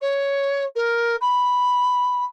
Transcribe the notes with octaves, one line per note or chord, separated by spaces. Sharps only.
C#5
A#4
B5